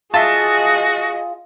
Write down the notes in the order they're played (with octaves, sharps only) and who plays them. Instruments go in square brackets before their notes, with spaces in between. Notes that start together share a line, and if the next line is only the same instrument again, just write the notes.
[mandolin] F4 [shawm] F#4 [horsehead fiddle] G#4 D#5 [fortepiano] E5 A5